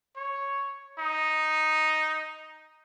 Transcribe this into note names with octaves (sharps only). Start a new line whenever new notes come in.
C#5
D#4